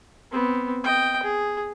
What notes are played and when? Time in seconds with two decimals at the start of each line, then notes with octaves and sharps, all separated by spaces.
0.31 B3 C4
0.84 D#5 G5
1.23 G#4